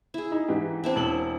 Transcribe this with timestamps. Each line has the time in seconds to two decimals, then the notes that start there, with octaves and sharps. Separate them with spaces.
0.14 E4 G#4
0.32 D#4
0.48 G#2 E3 G4
0.84 C4 D4 E4
0.96 E1 F#7